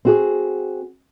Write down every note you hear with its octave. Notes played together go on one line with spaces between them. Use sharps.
C4 F#4 G#4